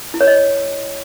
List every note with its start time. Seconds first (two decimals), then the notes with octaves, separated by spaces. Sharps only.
0.14 E4
0.21 C#5
0.27 D#5